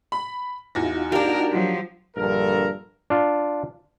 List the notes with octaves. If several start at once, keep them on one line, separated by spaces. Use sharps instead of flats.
B5
E2 D#4 F4 F#4 A#6
A#3 D4 G4 A#4
F3 F#3
A#1 G2 D3 A4 A#4
D4 F4